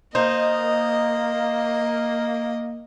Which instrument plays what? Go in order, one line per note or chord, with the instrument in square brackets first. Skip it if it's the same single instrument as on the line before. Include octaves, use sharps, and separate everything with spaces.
[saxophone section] A#3 [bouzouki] D#4 [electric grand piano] C5 [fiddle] D#5